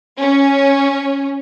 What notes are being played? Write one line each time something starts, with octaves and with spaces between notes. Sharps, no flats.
C#4